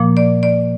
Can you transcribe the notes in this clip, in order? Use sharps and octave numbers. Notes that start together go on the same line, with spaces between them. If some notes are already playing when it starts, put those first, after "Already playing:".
Already playing: A#2 F3 A#3
D5
D5